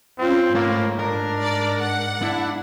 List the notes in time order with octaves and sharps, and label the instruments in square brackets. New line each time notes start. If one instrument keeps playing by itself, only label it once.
[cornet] C4 [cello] C#4 F4
[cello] G#2 [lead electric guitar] A3 C#5 [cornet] A#3
[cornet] D4 [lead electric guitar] A#4
[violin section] D5
F#5
[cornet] D4 [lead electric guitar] E4